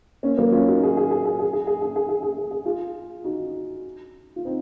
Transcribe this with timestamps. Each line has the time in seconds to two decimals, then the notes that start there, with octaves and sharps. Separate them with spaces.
0.23 A#3 C#4
0.37 F#3 A#3
0.52 C#4 F4
0.69 D#4 F#4
0.83 G#4
0.97 G#4
1.11 G#4
1.25 G#4
1.39 G#4
1.53 G#4
1.67 G#4
1.82 G#4
1.96 G#4
2.09 G#4
2.23 G#4
2.38 G#4
2.51 G#4
2.65 F4 G#4
3.24 D#4 F#4
4.36 F4
4.45 C4 D#4